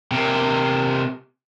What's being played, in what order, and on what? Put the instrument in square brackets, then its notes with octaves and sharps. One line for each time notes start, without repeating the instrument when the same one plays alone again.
[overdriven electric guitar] C3 A#3